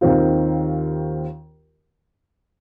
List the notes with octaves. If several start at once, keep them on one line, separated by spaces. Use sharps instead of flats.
D#2 D#3 C4 F4